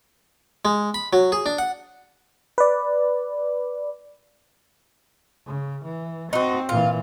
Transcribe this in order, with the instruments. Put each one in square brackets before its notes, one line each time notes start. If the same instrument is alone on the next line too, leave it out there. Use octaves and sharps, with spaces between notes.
[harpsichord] G#3
B5
F#3
G#4
D4
F#5
[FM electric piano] B4 D5
[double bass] C#3
E3
[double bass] C4 [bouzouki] D#4 F#4
[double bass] A#2 E3 [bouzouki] F4